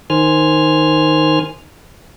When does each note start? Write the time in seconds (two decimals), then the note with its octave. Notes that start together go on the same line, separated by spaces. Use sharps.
0.10 D#3 C5 G#5 F6